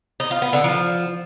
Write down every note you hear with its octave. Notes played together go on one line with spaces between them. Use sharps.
D#4
F4
B3
D3
F3